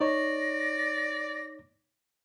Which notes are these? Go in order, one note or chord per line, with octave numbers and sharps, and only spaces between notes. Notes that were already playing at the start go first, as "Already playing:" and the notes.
D#4 C#5 D5 A#6